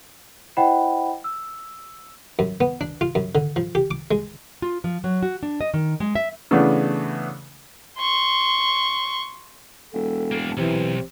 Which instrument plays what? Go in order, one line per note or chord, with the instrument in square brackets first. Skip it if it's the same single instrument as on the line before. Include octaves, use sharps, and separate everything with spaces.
[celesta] E4 C5 D#5 F#5 G5 B5
E6
[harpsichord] F#2
B3
D4
F4
F#2
D3
F3
G4
D6
G#3
[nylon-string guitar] F4
F3
F#3
F#4
D4
D#5
D#3
G#3
E5
[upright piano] C#3 E3 A3 B3 D4
[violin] C6 C#6
[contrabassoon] E1 [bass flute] A4
[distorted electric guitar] A#3 D4
[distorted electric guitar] B1 [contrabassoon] C3 [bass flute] E3